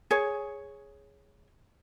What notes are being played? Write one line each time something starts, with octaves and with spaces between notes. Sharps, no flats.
G#4 C#5